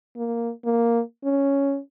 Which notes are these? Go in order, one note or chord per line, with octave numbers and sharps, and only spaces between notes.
A#3
A#3
C#4